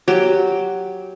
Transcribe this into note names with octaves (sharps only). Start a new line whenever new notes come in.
F#3 G4